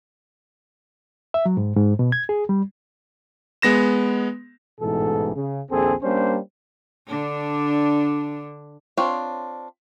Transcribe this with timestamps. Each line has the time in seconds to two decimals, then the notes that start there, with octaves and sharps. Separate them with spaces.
1.34 E5
1.46 F#3
1.57 G#2
1.76 G#2
1.99 B2
2.12 G#6
2.29 G#4
2.49 G3
3.62 G#3 B3 A#6 E7
4.81 A1 G#2 B2 E3 A4
5.35 C#3
5.70 A#1 D#2 C4 G#4 A4
6.02 G3 A#3 C#4 D4 C5
7.08 D3 D4
8.97 C4 D4 F4 C#5